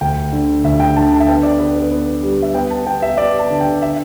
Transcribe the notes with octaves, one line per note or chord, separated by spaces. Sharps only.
D2 G5
D3
D2 E5
G5
D3 A5
A5
E5
B3 G5
D5
B3 B4
B4
B3
G3
E5
B3 G5
A5
B3 G5
E5
B3 D5
A5
D3
G5
E5